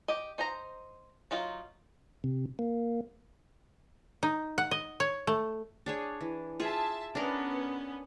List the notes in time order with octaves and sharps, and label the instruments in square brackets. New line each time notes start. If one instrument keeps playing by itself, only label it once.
[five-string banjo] G4 D#5
D#4 C5 D#5 A#5
F#3 D#4 F4
[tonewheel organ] C3
A#3
[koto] D#4
F#5
D#5
C#5
A3
[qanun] D4 G#4 C#5
E3
[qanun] F4 G#4 [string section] E5 A5
[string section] B3 C#4 [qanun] D4 A#4